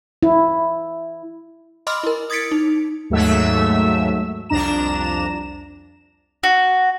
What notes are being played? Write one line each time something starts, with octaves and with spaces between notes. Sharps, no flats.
E4
D#5 B5 C6 D6 E6 F6
E4 A#4
D#6 G#6 A6 B6 C#7 D7
D#4
D#2 G#2 F#3 A3 E5 E6
C2 F2 D4 A#5 E7
F#4